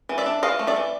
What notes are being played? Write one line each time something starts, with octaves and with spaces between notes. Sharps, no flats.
E3
D5 E5
D4
E3 D#5 F5
A3
D5 E5
E3